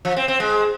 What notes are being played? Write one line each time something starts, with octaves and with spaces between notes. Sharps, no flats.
F3
C4
C4
G#3